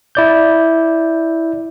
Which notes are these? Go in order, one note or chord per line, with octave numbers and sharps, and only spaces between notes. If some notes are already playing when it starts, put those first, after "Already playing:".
E4 D5 G6